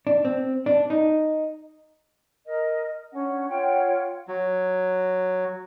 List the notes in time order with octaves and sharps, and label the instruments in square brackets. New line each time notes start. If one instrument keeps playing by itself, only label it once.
[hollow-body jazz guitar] D4
C4
D4
D#4
[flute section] A#4 D#5
C#4 D4 F#5
F4 C#5 F#5 G5
[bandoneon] F#3